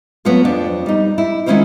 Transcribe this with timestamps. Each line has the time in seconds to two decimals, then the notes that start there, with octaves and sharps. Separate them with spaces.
0.25 F#3 A3 B3 C4 F4 A4
0.45 F2 D4 F4
0.86 G3 D#4
1.18 E4
1.46 D#3 G#3 C#4 E4 F4 C5